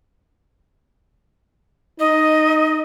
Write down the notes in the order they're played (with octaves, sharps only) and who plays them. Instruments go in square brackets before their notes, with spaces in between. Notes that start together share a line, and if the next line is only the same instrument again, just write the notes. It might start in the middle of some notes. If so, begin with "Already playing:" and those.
[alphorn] D#4 [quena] D#5